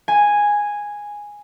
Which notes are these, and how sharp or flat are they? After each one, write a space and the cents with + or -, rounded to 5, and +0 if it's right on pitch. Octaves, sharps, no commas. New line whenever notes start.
G#5 -5